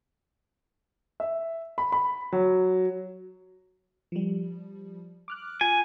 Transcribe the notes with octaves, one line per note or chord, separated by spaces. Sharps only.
E5
B5
B5
F#3
F3 G3
D6 F6 F#6
F4 G#5